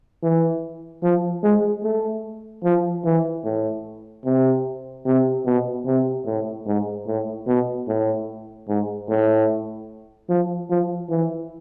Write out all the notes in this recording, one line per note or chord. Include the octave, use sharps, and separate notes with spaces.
E3
F3
G#3
A3
F3
E3
A2
C3
C3
B2
C3
A2
G#2
A2
B2
A2
G#2
A2
F3
F3
E3